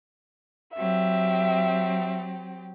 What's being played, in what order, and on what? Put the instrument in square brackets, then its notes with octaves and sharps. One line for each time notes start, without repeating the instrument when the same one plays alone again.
[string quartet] F#3 C4 G4 [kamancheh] E5